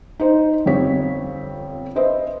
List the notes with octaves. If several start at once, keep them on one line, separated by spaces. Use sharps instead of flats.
D#4 C5
G1 F2 C4 G4 C#5 B6
B4 C5 D#5 E5